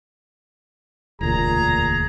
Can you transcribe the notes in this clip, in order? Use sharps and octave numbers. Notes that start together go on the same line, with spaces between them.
E1 D2 A#2 G#4 A#5